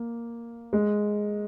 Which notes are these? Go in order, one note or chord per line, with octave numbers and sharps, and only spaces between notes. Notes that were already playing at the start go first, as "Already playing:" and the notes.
Already playing: A#3
G#3